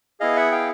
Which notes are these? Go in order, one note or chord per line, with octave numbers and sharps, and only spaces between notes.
B3 E4 G#4 D#5 F5
E5 F#5
F5 G5